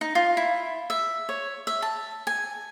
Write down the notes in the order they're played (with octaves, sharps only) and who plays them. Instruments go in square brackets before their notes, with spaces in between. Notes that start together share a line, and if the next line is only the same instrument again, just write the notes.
[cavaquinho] D#4
F4
E4
E5
C#5
E5
A5
G#5